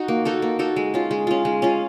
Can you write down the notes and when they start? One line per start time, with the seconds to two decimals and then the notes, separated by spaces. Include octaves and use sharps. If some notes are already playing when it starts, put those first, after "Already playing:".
Already playing: D#4 F#4
0.08 A#3
0.25 D#4 F#4 A4
0.42 A#3
0.59 D#4 F#4 A4
0.76 G#3
0.94 C#4 F4
1.11 G#3
1.27 C#4 F4
1.45 G#3
1.62 C#4 F4